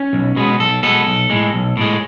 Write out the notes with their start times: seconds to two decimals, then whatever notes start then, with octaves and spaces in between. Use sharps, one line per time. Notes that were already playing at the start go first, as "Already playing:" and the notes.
Already playing: C#4
0.13 B1
0.36 B2 G#3 B3
0.60 B1 A4
0.83 B2 G#3 B3 A4
1.07 B1
1.30 A2 G#3
1.54 B1
1.77 A2 G#3